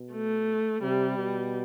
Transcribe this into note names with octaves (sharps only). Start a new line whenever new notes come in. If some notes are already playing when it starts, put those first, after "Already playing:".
Already playing: B2
A3
C3 G3
B2